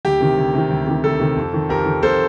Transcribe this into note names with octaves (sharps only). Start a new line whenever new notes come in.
D2 G4
C3 D#3
D2
C3 D#3
D2
C3 D#3
D2 A4
C3 D#3
F2
D#3
F2 G4 A#4
D#3
F2 A4 C5